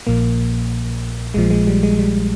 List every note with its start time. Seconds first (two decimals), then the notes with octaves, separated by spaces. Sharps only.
0.07 A#1 A#2 F3 A#3
1.34 A#1 A#2 F3 G#3
1.50 G#3
1.67 G3
1.83 G#3
1.99 G3